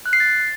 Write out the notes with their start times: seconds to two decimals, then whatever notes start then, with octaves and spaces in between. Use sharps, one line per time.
0.06 F#6
0.13 C7
0.20 A6